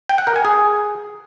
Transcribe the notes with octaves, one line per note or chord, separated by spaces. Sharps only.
G5
F#5
A#4
G#5
G#4